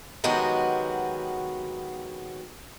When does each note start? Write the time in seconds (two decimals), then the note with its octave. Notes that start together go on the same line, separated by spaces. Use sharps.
0.24 D#3 F#3 G#3 B3 F#4 G4